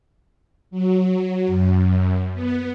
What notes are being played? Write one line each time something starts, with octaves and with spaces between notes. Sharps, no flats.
F#3
F#2
B3